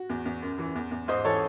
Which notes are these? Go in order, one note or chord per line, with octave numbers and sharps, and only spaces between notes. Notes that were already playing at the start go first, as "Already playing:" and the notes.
Already playing: F#4
E2
E2
F#2
E3
E2
E2
G#2 C5 D#5
E3 A4 C#5